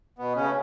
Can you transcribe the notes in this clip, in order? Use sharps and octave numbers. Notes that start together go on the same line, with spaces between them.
B2 B3
C#3 C#4
A3